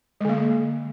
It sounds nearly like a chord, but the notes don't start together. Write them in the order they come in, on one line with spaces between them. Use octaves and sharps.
G#3 D3 A#3